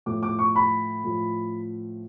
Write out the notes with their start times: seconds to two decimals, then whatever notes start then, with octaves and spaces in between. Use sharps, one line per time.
0.06 A2 F3 D6
0.23 D6
0.39 C#6
0.56 B5
1.04 A2 F3